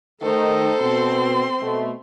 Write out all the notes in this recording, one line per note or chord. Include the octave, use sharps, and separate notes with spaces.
D#3 A3 D#4 A4 C5
B2 C4 C6
B2 A3